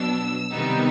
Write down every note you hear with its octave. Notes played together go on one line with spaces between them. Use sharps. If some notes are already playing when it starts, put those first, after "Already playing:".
Already playing: B2 F#3 B3 D4 E6
C3 D#3 G3 B3 D#4